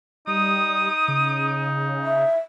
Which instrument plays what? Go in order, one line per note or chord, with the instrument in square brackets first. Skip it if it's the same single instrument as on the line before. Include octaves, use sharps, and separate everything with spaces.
[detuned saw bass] G3 [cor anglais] D#4 [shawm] D#6
[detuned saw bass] C#3
[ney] E5